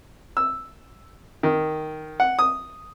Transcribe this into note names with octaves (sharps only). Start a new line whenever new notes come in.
E6
D#3
F#5
D#6